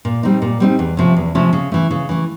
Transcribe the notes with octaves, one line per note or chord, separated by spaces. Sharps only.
A#2
G3 C4 D#4
A#2
G3 C4 D#4
E2
C3 F3 A3 C#4
E2
C3 F3 A3 C#4
C#3
E3 A3
C#3
E3 A3